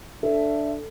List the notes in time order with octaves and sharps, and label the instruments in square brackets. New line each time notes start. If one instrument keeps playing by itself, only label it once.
[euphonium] D4 [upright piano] A4 [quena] E5